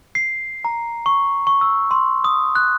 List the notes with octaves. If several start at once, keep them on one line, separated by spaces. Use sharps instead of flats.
C7
A#5
C#6
C#6
E6
C6
D#6
F#6